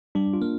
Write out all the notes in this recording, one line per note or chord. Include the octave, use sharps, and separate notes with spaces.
G3 D4
F4
A#3